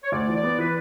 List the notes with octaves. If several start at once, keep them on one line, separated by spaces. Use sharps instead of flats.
C#5
D2 D5
E3
D5
B3
E3 B4